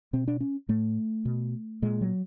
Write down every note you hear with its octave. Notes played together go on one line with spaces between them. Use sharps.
B2 C4
D4
C#4
A2 A3
B2
A#2 G#3
F#3